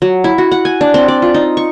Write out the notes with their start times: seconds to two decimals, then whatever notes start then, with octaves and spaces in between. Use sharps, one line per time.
0.02 F#3
0.24 E4
0.38 F#4
0.52 F#5
0.65 G#5
0.81 D4
0.94 C4
1.08 D5
1.22 F4
1.34 D#4
1.57 C#6